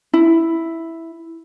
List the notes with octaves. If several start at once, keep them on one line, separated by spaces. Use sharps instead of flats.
E4